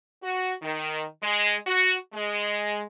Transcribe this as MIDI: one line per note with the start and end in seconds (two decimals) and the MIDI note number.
0.23 0.53 66
0.62 1.04 51
1.23 1.55 56
1.67 1.95 66
2.14 2.83 56